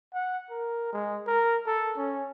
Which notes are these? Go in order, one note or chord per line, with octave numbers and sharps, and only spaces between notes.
F#5
A#4
G#3
A#4
A4
C#4